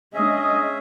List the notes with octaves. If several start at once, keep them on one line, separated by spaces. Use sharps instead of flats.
G#3 C#4 D4 G#4 D#5 E5